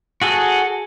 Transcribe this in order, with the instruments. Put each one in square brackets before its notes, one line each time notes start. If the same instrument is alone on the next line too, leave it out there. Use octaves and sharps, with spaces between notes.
[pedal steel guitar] F#4 G#4 A4